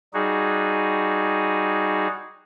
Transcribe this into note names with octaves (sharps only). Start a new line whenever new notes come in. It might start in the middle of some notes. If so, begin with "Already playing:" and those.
G3 D#4 F#4 G#4